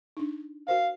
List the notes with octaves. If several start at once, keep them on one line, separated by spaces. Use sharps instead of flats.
D4 D#4
F#4 A#4 C5 F5